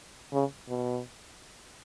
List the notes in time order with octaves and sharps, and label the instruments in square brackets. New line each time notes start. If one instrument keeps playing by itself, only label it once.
[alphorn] C#3
B2